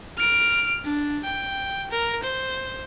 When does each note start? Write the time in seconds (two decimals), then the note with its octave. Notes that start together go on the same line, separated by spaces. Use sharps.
0.18 F6 D7
0.85 D4
1.24 G5
1.91 A#4
2.23 C5